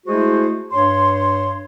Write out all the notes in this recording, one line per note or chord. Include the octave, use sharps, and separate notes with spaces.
G#3 A3 E4 F#4 G#4 C5
G2 C#5 C6